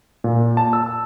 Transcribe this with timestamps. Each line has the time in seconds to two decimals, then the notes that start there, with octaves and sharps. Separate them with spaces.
0.24 A#2
0.57 A5
0.73 E6